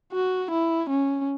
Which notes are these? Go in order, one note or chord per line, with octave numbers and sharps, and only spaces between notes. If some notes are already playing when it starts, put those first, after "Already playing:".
F#4
E4
C#4